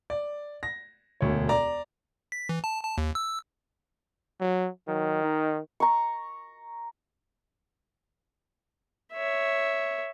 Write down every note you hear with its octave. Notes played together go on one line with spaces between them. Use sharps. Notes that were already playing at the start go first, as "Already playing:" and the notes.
D5
A#6
E1 D2 C#5
D5 A#5
B6
E3
A5
A5
D#2
E6
F#3
D#3 F#3
D#4
A#5 C#6
C#5 E5